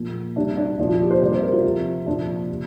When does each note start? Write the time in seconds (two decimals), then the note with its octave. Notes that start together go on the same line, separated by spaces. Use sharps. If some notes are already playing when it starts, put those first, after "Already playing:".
Already playing: A#2 F3 F4
0.36 C3 G3 D4
0.57 D4
0.78 A#2 F3 D4
0.89 F4
1.01 G4
1.11 C5
1.21 C3 G3 D5
1.32 C5
1.42 A#4
1.53 F4
1.64 C3 F3
2.06 A#2 F3 D4
2.50 C3